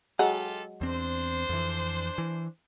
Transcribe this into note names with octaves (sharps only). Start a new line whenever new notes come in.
F#3 G#3 F4 G4 A4 F#5
E2 C4 D4 C5
F2 E3
E3